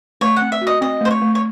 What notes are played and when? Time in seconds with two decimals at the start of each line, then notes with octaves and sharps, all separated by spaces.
0.21 A3 C#5
0.36 C4 F#5
0.52 E5
0.61 F#4
0.67 D#5
0.81 C4 D#5
1.01 A3 C5
1.10 C#5
1.22 A3
1.35 C#5